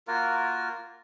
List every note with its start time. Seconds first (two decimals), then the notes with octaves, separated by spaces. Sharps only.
0.08 A#3 F4 F#4 A#4